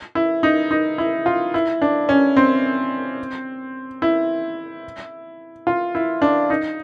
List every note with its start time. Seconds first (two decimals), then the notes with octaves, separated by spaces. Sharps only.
0.15 E4
0.43 D#4
0.71 D#4
0.98 E4
1.26 F4
1.54 E4
1.82 D4
2.09 C#4
2.37 C4
4.02 E4
5.67 F4
5.95 E4
6.22 D4
6.50 D#4